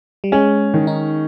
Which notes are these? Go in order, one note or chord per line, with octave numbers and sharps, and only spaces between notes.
G3
G#3 C#4
D#3
D#4